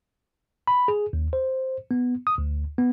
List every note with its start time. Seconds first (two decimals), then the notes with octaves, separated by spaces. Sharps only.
0.67 B5
0.88 G#4
1.13 D#2
1.33 C5
1.91 B3
2.27 D#6
2.38 D2
2.78 B3